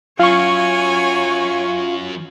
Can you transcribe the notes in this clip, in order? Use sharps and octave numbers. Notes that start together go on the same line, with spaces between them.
F#2 F#3 F4 C#5 F5 G#5 C#6